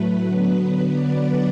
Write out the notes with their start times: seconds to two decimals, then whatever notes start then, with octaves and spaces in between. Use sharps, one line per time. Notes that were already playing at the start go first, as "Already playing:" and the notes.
Already playing: A2 F#3 A3 B4
0.25 D3 F#3 B3
0.93 D5